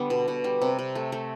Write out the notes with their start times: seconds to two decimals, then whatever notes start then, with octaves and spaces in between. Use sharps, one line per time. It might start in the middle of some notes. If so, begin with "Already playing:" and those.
Already playing: D3 G3 B3
0.10 B2
0.28 B2
0.44 G3
0.62 C3
0.79 C3
0.95 A3
1.12 A3